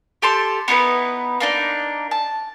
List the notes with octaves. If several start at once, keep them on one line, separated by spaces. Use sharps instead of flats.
G4 A4 A5 C6
B3 D#4 E4 B4
A#3 D4 D#4
A5